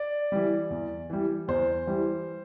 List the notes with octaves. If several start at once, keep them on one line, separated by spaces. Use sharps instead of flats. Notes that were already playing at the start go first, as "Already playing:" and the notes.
Already playing: D5
E3 G3
E2
E3 G3
E2 C5
E3 G3